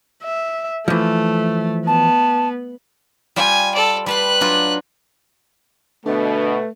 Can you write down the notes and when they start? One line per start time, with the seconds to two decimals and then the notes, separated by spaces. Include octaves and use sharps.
0.24 E5
0.88 E3 F3 A3
1.87 B3 A5
3.36 G3 F4 G5 G#5
3.75 A4 D5
4.06 G3 B4 A5 C6 F#6
4.41 F#3 D4 F4
6.06 B2 D3 A3 B4